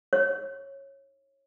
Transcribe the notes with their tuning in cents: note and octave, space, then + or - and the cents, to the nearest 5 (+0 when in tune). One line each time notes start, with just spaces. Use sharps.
C#5 -15